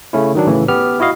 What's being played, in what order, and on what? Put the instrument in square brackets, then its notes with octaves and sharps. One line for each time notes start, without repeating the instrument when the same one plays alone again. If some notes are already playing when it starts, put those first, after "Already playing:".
[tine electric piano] C#3 A3 C#4 E4
D#3 F#3 D4
A2 C#3 E3
B3 G4 F6
E4 F#4 D#5 F5